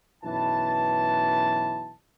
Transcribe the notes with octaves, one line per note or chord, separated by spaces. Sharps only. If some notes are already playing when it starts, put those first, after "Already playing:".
B1 F#2 E3 B4 A5